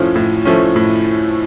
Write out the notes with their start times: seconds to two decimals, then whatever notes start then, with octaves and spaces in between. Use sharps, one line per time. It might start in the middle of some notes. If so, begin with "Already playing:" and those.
Already playing: A2 F3 A3 C#4
0.15 A2
0.45 F3 A3 C#4
0.76 A2